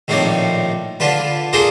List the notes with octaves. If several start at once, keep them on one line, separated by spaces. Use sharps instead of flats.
A#1 A2 D#3 C4 C#5 D5
D3 D4 F4 B4
A#3 D4 F4 G#4 A4 C5